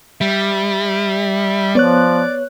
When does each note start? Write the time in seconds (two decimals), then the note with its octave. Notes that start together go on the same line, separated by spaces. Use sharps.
0.21 G3 E5
1.75 F3 B3 C#5 D5 F#6